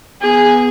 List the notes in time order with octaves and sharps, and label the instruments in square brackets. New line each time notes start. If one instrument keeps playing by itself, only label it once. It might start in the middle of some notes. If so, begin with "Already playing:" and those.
[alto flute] B3 [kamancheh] G#4